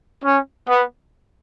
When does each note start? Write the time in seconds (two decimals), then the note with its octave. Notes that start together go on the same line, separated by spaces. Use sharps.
0.23 C#4
0.69 B3